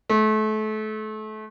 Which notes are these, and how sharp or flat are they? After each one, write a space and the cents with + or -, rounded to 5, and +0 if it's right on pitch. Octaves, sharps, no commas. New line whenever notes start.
A3 -30